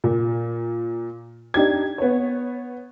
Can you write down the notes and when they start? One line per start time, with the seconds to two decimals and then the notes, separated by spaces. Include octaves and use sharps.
0.04 A#2
1.54 D4 D#4 G4 G#6
1.98 B3 C#5